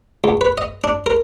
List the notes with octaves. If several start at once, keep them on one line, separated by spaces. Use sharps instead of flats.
C#2
B4
D#5
D4
A#4